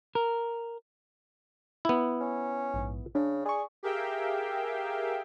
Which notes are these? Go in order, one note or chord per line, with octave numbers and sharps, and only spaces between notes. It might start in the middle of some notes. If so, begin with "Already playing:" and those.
A#4
B3 E4
C#4
A#1 G#2
C#3 D4
G#4 D5 C#6
G4 G#4 A#4 E5 F5 G5